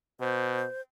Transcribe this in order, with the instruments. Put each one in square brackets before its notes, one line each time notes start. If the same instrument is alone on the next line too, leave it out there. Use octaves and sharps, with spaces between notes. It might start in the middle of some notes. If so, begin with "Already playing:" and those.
[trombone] B2 [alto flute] C5